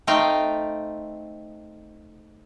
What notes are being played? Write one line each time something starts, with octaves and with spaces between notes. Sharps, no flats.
A3 C4 D#4 F5 G5